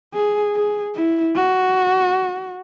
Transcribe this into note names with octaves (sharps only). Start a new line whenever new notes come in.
G#4
G#4
E4
F#4